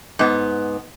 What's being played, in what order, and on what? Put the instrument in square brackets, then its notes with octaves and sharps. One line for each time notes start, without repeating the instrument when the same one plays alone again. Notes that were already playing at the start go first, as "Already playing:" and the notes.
[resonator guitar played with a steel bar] G#2 B3